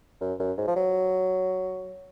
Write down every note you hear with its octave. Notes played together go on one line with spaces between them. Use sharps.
F#2
F#2
G#2
F3
F#3